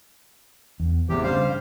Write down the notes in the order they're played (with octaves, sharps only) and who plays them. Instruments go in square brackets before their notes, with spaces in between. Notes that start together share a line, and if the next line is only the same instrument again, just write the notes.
[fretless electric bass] E2
[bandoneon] E2 C3 G4 [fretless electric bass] E3 F3 A3
[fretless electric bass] G2 C#3 [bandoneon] G3 C5 F5